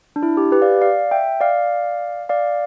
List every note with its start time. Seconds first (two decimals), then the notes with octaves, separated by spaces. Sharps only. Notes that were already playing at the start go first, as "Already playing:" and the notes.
0.16 D4
0.23 E4
0.37 G4
0.52 G4 B4
0.62 D5 F5
0.81 D5 F5
1.11 E5 G5
1.41 D5 F5
2.29 D5 F5